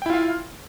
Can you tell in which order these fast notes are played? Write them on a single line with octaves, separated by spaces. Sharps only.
G5 E4 F4 F5